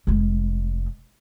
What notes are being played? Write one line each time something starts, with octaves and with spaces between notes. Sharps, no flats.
F1 G#3